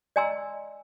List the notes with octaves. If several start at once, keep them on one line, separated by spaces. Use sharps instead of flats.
D5 D#5 G#5 A#5 C6 E6